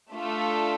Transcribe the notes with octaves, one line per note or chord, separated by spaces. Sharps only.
A3 D4 F4 A4